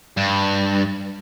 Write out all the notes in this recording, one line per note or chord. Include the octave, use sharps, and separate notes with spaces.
G2